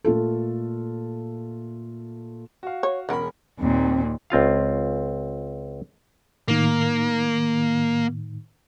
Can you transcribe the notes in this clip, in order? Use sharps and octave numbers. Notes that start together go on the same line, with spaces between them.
A#2 A3 F4 A4
F#4 F5
C#5
E1 C#3 A#4 F#5 B5
D#2 A#2 C4
C#2 C4 F4 F5
A2 D#3 A#3